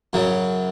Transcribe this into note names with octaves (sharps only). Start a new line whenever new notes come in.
F#2 C#3 F#3